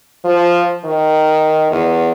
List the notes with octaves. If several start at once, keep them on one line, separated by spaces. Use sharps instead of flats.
F3
D#3
E2